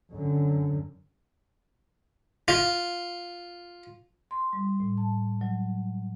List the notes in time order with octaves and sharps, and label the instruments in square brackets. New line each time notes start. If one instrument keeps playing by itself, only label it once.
[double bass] F#2 D3
[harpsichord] F4
[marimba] C6
G3
A2
A5
F#3